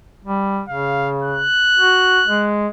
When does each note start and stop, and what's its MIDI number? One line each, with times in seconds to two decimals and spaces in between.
0.24 0.61 55
0.69 1.45 49
0.69 1.11 77
1.22 2.50 90
1.76 2.21 66
2.28 2.68 56